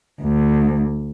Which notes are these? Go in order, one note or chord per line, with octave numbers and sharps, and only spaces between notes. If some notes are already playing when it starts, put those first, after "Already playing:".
D2